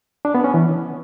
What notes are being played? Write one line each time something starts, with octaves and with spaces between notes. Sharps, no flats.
D4
B3
C#4
E3